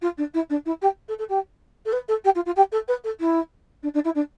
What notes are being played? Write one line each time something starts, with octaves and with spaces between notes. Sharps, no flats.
F4
D4
E4
D4
E4
G4
A4
A4
G4
A4
B4
A4
G4
F4
F4
G4
A4
B4
A4
E4
D4
D4
E4
D4